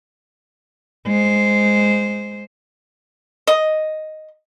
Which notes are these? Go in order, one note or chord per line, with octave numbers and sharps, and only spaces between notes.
G#3 C5
D#5